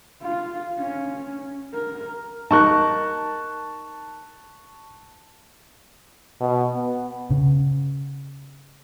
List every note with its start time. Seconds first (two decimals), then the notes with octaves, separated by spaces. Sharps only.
0.22 F4
0.78 C#4
1.74 A#4
2.51 D#4 A#4 A5 C#6 F#6
6.40 B2
6.74 B3
7.30 C#3